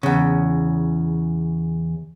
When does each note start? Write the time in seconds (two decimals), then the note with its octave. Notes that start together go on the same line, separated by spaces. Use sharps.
0.03 E2 C#3